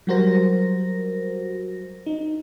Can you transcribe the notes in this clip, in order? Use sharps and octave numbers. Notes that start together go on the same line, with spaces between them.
F#3 G3 F#4 A#4 C5 A#6
D#4